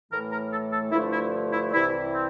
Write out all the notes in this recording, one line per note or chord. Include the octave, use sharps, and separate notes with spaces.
A2 E3 A3 A#4
A#4
A4
A4
G2 D3 F3 A3 E4
E4
E4
C2 C3 E3 G3 E4
C4